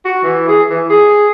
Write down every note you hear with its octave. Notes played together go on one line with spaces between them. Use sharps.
F#4
E3
G#4
E3
G#4